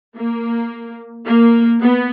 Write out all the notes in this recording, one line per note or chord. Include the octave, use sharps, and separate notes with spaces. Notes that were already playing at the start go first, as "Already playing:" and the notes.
A#3
A#3
B3